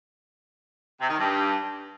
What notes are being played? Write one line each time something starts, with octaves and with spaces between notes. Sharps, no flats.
C3
D#3
G2